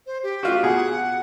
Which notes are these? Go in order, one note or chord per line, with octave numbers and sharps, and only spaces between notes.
C5
G4
F4 F#4
B2 G#4 F#5